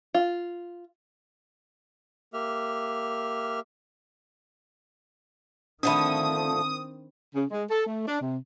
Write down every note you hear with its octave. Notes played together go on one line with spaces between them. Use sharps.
F4
A#3 G4 E5 F6
D3 D#3 F3 A3 C4 D4 B5 D#6
C#3
G#3
A4
A3
D4
C3